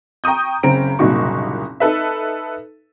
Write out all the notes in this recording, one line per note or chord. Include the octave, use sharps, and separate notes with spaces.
G5 A#5 C#6 D#6 G6
F#1 C#3 C4 A#5 D7
F#1 C2 A#2 D#4 F#4 C#6
D#4 A4 B4 E5